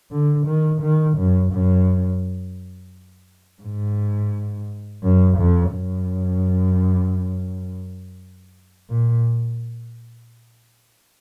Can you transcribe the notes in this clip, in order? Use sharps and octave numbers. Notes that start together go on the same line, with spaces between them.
D3
D#3
D#3
F#2
F#2
G#2
F#2
F2
F#2
A#2